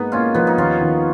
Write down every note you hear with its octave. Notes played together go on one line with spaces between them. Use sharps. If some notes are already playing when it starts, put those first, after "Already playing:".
Already playing: G#2 A#3 B3 D#4
A#3 C#4 F4
F3 B3 D#4
D#4
D#2 C#4 F4
D#3